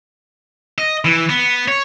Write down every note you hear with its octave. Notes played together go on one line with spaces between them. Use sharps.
D#5
E3
B3
C#5